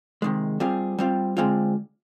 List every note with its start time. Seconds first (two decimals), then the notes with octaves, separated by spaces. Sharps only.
0.22 C3 D#3 G#3
0.60 G3 C4 F4 G#4
0.98 G3 C4 F4
1.37 D3 G#3 C4 F4